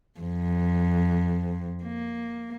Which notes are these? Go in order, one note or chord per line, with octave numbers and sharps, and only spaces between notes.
F2
A#3